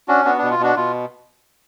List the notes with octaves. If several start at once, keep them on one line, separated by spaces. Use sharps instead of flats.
C#4 D4 F#4
B3 D4 F#4
B2 D4
F4
B2 D4 F#4
B2 F4